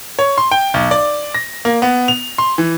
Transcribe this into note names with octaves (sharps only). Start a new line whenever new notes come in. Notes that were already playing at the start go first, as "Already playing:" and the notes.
C#5
C6
G5
B1
D5
A#6
A#3
B3
F7
C6
E3